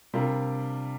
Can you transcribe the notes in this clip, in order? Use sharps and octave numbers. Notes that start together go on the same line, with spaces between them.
C3 G3 D4 F4 A#4